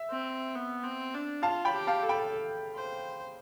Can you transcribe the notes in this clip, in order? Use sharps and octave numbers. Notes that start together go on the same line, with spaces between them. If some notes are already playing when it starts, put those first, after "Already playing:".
Already playing: E5
C4
B3
C4
D4
F4 F5 A5
G5 B5
G4
F5 A5
A4
G5 B5
C5